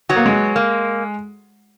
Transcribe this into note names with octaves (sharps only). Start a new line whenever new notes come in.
F#3 B3 F#4
A#3
G#3
A#3